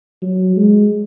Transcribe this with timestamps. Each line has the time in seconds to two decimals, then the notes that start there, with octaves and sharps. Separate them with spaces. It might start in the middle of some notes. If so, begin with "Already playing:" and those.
0.22 F#3
0.56 G#3